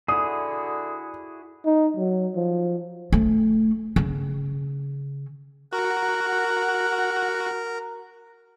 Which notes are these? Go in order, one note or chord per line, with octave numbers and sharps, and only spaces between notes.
D3 E4 F#4 G#4 D#6
D#4
F#3
F3
A3
C#3
F#4 A#4 F#5